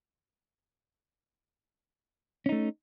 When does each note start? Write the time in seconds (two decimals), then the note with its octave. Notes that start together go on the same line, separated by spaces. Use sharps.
2.46 C#4
2.49 D#4
2.52 A3